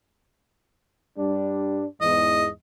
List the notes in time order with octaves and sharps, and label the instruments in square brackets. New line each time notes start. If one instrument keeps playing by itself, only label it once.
[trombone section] G2 G3 D4
[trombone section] E2 G#2 [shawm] D#5